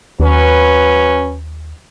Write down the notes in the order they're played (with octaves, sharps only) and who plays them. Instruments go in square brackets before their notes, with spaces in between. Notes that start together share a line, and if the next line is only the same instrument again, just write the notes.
[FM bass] D#2 [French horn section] F#3 C#4 B4